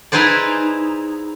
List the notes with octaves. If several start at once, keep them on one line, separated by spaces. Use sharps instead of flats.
D#4 E4 G#4 B4 C5 D5